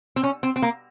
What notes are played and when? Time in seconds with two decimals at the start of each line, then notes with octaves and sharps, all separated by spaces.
0.16 C4
0.23 C#4
0.43 C4
0.56 C4
0.62 A#3